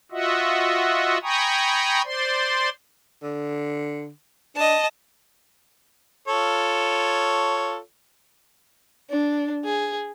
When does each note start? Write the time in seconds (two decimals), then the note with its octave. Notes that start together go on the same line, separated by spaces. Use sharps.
0.12 F4 F#4 D#5 E5 F#5
1.23 G5 G#5 A#5 B5 C#6 D#6
2.05 C5 D5 C6
3.23 D3
4.56 D4 D#5 A5
6.28 F4 A4 C#5
9.10 D4
9.65 G#4